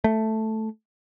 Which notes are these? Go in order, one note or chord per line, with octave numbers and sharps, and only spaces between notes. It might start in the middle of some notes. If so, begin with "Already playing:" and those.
A3